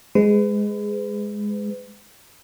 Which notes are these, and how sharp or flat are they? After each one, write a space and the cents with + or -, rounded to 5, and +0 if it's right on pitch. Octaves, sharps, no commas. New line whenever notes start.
G#3 +0 B4 +35